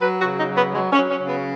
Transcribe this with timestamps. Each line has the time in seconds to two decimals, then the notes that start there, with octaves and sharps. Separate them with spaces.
0.01 F#3 B4
0.20 F#4
0.25 C#3
0.38 D#4
0.50 F#3
0.56 B3
0.74 F#3 G#3
0.93 C#4
0.98 F#3
1.10 C#4
1.23 C#3
1.28 B3